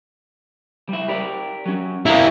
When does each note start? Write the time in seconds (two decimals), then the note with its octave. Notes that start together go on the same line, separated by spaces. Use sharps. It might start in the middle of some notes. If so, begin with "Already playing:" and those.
0.89 G3 E4
1.08 G4 A#4 D5
1.66 F#3 C#4
2.06 E4 G4 A#4 F5 A#5